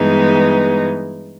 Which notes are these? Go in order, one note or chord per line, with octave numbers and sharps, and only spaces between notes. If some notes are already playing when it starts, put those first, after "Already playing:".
Already playing: G2 E3 G#3 B3 D#4